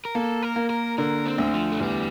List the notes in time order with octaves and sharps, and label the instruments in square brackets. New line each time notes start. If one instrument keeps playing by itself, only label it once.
[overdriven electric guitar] A#4
[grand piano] A#3 [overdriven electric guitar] A4
[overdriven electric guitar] A#4
[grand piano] A#3
[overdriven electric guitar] A#4
[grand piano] D3 [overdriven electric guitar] A#4
[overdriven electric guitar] C4
[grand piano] D2
[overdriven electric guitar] F3
A3
[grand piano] E2 [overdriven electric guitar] G3